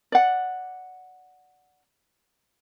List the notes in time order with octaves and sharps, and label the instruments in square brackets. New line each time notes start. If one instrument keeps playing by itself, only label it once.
[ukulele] D5 F#5